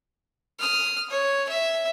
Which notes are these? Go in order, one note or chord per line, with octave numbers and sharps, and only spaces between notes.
D#6 F6
C#5
E5